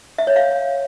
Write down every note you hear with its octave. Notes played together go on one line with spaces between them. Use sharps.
E5
C#5
F5